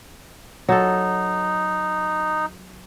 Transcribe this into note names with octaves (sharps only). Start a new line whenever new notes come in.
F#3 D#4 A4